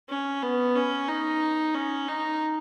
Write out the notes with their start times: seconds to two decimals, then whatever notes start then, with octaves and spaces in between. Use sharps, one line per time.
0.09 C#4
0.42 B3
0.75 C#4
1.08 D#4
1.75 C#4
2.08 D#4